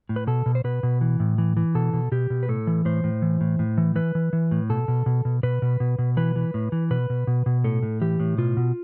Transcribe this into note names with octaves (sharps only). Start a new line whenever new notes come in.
A2
B4
B2 A4
B2
C5
B2 B4
B2
E3
A2
E3
E3
B2 A4
B2
B2 G4
B2
B4
A2 A4
E3
A2 C5
A2
E3
A2
A2
E3
E3 B4
E3
E3
A2
B2 A4
B2
B2
B2
B2 B4
B2
B2
B2
E3 B4
E3
A2
E3
B2 B4
B2
B2
B2
A2 A4
A2
E3 G4
A2
B2 F4
B2